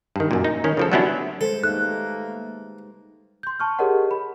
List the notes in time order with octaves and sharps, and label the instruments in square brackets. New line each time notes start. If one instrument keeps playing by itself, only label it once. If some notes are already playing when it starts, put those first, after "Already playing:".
[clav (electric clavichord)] G2 D#3
F#2 A#2
D#4
D#3 C#4
C#3 F3 A4
F#3 G3 B3 C#4 D4 E4
[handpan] G3 G#3 C5 [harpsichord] A4
[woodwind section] A3 A#3 [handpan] D#4 G4 B4 [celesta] F#6
[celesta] C6 G6
A5 C#6 F6
G4 G#4 A#4 C#5 D#5 F#5
B5